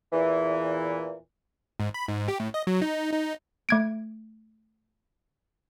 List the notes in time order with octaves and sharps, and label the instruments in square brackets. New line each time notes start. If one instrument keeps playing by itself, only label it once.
[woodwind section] E2 A#2 E3
[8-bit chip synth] G#2
B5
G#2
G4
A2
D#5
F#3
D#4
D#4
[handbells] A3 G#6 D7